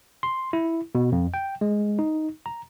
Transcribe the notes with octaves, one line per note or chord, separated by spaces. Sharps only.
C6
E4
B2
F2
G5
G#3
D#4
A#5